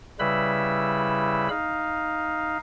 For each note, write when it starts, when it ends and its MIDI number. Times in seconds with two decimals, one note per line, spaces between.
0.19 1.49 49
0.19 1.49 55
0.19 1.49 64
0.19 1.49 71
0.19 1.49 83
0.19 1.49 88
1.50 2.58 63
1.50 2.58 77